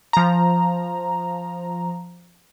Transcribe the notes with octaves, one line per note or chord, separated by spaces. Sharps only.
F3 A#5